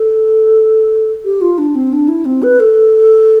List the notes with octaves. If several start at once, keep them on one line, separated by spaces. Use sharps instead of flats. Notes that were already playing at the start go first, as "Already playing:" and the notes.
Already playing: A4
G4
F4
D4
C4
D4
E4
C4
B4
A4